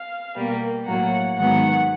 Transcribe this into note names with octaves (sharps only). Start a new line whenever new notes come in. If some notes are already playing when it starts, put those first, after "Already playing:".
Already playing: F5
B2 G3 A#3
A2 F#3 A#3 F#5
G#2 D#3 F#3 B3 F#5